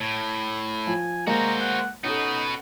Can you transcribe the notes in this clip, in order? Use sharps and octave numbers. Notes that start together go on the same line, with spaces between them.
A2
F3 G#5
G#3 A#3 F#4 C5 A#5
F#5
B3 C#4 D#4 F#4 A4